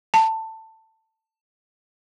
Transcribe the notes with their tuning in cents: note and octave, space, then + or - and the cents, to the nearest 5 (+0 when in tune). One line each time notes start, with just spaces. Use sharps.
A5 +15